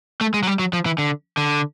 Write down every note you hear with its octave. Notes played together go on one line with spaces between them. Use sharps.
A3
G#3
F#3
G3
F#3
F3
E3
D3
D3